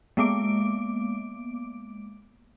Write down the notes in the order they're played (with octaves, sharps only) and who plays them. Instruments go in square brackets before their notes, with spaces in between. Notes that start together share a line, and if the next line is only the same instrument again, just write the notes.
[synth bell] G#3 A#3 B3 D6 D7